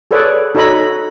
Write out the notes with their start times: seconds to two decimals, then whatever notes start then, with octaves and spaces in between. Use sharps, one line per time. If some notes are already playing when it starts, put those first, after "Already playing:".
0.11 G#4 A4 B4 C#5 D5
0.55 D#4 F#4 A4 C#5 D#5 B5